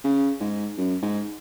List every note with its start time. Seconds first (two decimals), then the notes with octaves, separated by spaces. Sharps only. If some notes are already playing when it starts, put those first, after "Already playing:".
0.04 C#3
0.41 G#2
0.78 F#2
1.02 G#2